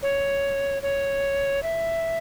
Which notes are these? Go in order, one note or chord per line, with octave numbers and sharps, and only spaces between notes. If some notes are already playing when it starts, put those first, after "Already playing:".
C#5
C#5
E5